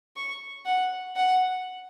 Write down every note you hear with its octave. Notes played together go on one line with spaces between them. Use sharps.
C#6
F#5
F#5